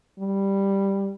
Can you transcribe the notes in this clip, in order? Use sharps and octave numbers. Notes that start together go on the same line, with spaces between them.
G3